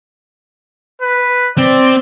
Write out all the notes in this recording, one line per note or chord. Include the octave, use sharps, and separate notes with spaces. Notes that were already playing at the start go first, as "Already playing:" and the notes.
B4
C4 D5